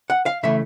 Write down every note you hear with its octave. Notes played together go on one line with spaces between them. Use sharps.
F#5
F5
C#3 E3 A3 E5